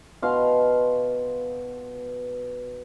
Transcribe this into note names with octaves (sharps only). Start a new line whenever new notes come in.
B2 F5 C6